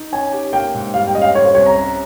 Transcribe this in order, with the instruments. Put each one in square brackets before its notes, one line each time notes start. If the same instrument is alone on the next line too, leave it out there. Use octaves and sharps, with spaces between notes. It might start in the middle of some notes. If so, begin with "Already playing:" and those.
Already playing: [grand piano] D#4
[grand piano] C#4 [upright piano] G#5
[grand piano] G4
[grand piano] A#3 [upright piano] G5
[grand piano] G#2
[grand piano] G3 [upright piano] F5
[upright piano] G5
[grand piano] C#4 [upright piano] D#5
[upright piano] F5
[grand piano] G3 [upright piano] C#5
[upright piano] C5
[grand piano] C2 [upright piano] C#5
[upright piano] A#5
[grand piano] C#4